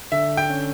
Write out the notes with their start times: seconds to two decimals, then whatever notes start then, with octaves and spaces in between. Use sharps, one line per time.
0.12 D3 E5
0.37 G5
0.50 C#4